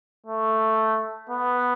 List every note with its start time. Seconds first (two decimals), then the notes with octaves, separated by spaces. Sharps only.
0.27 A3
1.30 B3